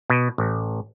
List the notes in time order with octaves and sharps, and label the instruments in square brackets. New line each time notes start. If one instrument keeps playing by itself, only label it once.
[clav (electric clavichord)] B2
A1